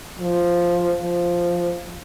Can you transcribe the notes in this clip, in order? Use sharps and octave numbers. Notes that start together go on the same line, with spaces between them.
F3
F3